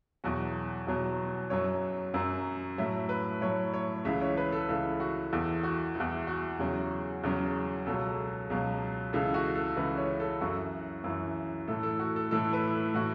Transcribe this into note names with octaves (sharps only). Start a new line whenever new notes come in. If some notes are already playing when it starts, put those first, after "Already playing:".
E2 B2 F#3 F#4
E2 B2 F#3
F#2 F#3 C#5
F#2 F#3
A2 F#3 E5
B4
A2 F#3 C#5
C#5
C#2 C#3 E3 E5
C#5
B4
A4
C#2 C#3 E3 A4
F#4
E2 E3 A4
F#4
E2 E3
F#4
E2 C#3 F#3
E2 C#3 F#3
C#2 B2 F#3 A4
C#2 B2 F#3
C#2 C#3 E3 A4
F#4
A4
C#2 C#3 E3 B4
C#5
A4
F#2 E3 F#4
F#2 E3
A2 E3 A4
A4
F#4
A4
A2 E3 A4
B4
A4
A2 E3 F#4